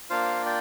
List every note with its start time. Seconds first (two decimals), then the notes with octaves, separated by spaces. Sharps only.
0.10 A#3 D4 F4 C5 F5
0.46 D5 G5